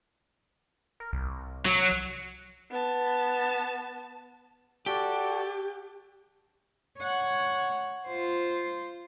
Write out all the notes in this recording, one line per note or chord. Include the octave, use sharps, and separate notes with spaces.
A#4
C2
F#3
B3 A5
F#4 G4 A4 D5
C#5 F#5
F4 C5